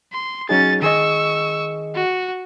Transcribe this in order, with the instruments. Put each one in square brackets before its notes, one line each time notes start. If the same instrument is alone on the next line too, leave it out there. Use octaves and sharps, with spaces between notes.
[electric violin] C6
[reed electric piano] F#3 D#4 G#4 [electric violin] C#4 A6
[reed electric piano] D#3 G#4 D#5 [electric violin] C#6 E6
[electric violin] F#4